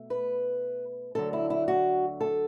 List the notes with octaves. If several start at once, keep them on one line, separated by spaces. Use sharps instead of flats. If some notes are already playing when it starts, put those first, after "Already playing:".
Already playing: B2 A3
B4
D2 D3 F#3 A4
E4
E4
F#4
A4